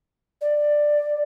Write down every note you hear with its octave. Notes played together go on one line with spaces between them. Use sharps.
D5